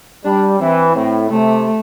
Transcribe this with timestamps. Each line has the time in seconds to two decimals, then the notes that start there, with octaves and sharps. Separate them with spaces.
0.25 G3 D4
0.60 E3 C4
0.95 A2 C4
1.30 C3 A3